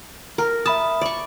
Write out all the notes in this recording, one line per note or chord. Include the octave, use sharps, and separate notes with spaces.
A#4
E5 A5 B5 D#6
D5 C#6